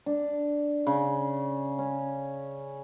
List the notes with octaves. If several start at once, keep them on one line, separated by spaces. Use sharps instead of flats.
D4
C#3
C#4